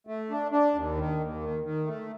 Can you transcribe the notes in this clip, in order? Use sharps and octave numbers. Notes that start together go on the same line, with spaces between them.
A3
D4
D4
D#2
D#3
D#2
D#3
D#3
A3